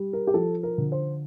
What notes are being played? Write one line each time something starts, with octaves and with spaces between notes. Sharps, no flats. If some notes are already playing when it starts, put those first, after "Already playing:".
Already playing: G3
A#4
G4
F3 A4
A#4
D3
C5